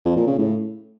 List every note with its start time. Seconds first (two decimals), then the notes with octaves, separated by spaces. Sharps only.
0.05 F2
0.16 A#2
0.27 C#3
0.38 A2